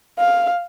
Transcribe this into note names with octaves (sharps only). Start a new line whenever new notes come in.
F5